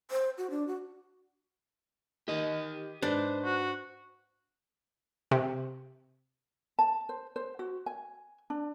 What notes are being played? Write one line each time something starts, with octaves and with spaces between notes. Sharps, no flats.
C5
F#4
D4
F#4
D#3 G4 D#5
G#2 D4 B4 C5 A6
F#4
C3
A5
C5
C5
F#4
G#5
D4